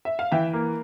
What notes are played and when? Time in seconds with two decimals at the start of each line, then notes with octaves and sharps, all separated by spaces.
0.05 E5
0.19 F5
0.32 E3 E5 G5
0.53 A#3